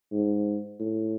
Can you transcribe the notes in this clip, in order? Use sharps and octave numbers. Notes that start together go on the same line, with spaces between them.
G#2
A2